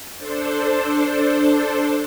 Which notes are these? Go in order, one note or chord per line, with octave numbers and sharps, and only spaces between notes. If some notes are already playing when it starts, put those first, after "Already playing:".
D4 A4 C5